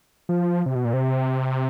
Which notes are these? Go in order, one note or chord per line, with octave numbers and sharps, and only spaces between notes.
F3
C3
B2
A#2
C3